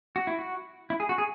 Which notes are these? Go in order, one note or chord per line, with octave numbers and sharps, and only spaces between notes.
F#4
E4
F#4
E4
G#4
F#4
G#4